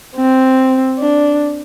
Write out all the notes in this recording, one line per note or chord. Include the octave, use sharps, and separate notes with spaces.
C4
D4